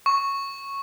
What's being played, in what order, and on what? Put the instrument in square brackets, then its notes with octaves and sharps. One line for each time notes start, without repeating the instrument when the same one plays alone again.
[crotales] C#6